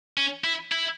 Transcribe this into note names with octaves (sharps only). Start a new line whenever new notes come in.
C#4
E4
E4